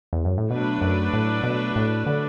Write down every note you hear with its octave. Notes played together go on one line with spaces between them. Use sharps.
E2
F#2
A2
B2 F#3 A3 D4 B4 D5
F#2
A2
B2
A2
D3